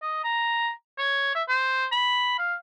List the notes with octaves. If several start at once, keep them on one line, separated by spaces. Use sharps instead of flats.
D#5
A#5
C#5
E5
C5
B5
F5